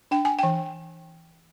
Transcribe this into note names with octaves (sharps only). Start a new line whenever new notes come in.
D4 G5
G#5
E3 G5